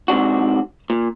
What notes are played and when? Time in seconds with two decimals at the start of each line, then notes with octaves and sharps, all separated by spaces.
0.08 G#2 C3 D4 F#4
0.90 A#2